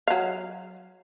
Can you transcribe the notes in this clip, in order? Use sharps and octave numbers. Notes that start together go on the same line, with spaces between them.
F#3 F5